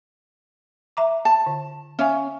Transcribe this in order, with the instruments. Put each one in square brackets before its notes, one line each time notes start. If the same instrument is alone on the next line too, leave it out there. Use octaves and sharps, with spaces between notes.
[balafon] E5 A#5 D6
[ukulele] A5
[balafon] D3
[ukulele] C#4 [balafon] E5 F5 G#5